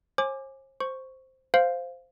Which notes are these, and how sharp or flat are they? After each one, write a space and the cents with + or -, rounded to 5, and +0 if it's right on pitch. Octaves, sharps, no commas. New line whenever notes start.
C5 +45 G#5 +0 D6 +10
C5 +0 C#6 +0
C5 -5 F5 +0